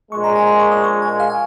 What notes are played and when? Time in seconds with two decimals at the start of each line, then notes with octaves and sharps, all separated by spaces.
0.11 A#1 A#2 G#3 C#6
0.24 A#5
0.36 G#5
0.47 A#5
0.59 C#6
0.72 D#6
0.84 C#6
1.02 G#5
1.20 F5
1.30 G#5